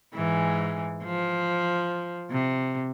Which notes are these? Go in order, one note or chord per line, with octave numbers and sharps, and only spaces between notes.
G#2 E3
F3
C3